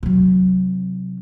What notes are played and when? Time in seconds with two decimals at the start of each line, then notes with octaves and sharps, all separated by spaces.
0.03 C3 F#3